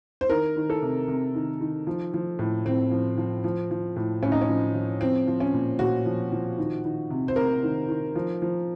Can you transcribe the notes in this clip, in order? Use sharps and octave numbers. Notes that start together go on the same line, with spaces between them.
C5
D#3 A#4
D#3
A4
C3
C3
D#3
D#3
F3
F3
A2
A2 C4
F3
F3
F3
F3
A2
A2 C#4
D#4
C#4
F3
F3
F3 C4
F3
C#4
A#2
A#2 F#4
F3
F3
D#3
D#3
C3
C5
C3 A#4
D#3
D#3
F3
F3